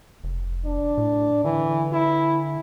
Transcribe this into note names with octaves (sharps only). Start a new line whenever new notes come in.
F1
D4
A2
D3 E3
E4